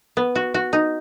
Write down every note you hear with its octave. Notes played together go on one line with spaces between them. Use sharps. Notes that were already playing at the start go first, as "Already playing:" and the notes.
B3
F#4
F#4
D#4